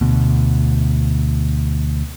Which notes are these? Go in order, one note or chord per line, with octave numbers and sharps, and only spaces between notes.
D2 B2